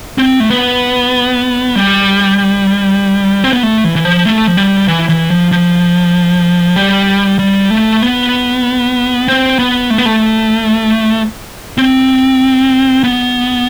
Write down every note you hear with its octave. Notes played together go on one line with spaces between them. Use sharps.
C4
A3
B3
G3
C4
B3
A3
E3
E3
F3
A3
F3
G3
E3
E3
F3
F3
G3
G3
A3
B3
C4
B3
A3
B3
A3
C4
B3